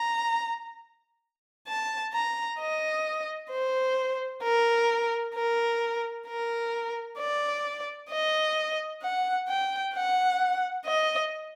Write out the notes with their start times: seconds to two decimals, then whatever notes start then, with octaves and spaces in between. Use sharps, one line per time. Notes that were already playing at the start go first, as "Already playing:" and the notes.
Already playing: A#5
1.68 A5
2.13 A#5
2.59 D#5
3.51 C5
4.43 A#4
5.35 A#4
6.27 A#4
7.19 D5
8.10 D#5
9.02 F#5
9.47 G5
9.94 F#5
10.86 D#5